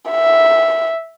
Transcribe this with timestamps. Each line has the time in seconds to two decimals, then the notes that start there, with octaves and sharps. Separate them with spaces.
0.10 E5